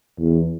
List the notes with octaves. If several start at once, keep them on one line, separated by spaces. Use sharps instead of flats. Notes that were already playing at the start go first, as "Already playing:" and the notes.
E2